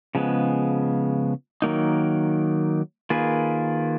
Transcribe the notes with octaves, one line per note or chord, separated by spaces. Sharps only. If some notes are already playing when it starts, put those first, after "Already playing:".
C#3 F3 G#3 B3
D#3 F#3 A#3 D#4
D#3 A#3 F4 G#4 B4